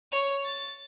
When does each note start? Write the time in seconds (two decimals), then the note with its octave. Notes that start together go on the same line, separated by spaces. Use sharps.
0.12 C#5
0.45 A6